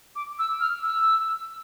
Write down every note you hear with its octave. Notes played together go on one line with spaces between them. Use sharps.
D6
E6
F6
E6